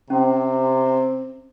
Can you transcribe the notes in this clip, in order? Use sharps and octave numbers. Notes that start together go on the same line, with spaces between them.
C3 C4 C#4